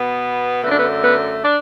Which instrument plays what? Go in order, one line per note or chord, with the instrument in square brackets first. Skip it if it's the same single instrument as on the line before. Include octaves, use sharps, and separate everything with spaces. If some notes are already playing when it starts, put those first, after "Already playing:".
Already playing: [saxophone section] B2 B3
F#2 D3 A3 B3
D4
B3
B3
D4